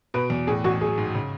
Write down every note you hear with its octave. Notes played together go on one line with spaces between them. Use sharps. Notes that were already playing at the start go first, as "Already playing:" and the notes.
B2 B4
E2
A2 G#4
A1 F#4
F#3 G#4
G#2
C#3